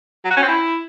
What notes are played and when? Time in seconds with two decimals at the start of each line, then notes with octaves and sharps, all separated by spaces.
0.25 F#3
0.31 F#4
0.37 C#4
0.43 C4
0.48 E4